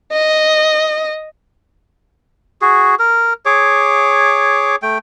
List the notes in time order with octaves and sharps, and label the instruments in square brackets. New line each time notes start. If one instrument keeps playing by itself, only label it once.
[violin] D#5
[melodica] F#4 G#4
A#4
G#4 C#5 D6
A3 G5